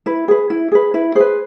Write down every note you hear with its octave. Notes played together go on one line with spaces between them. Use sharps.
E4 B4
G#4 B4
E4
G#4 B4
E4 B4
G#4 B4 C5